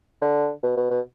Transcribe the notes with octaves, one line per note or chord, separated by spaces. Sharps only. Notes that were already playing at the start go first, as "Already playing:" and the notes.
D3
B2
B2
B2